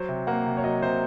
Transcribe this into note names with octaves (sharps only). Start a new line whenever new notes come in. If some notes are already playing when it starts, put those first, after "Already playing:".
Already playing: F#3 C5
C3
A#3 F#5
C3
C#5
F#3 D#5
C3 C5